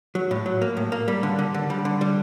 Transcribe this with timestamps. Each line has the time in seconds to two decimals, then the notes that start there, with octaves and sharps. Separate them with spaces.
0.15 F#3
0.31 A2
0.46 F#3
0.62 A#3
0.77 A2
0.92 A#3
1.08 G3
1.23 D3
1.39 D3
1.54 D3
1.70 G3
1.85 D3
2.01 G3